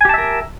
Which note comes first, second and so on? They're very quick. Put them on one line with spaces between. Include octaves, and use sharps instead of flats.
G#5 G4 A5 E5 A#4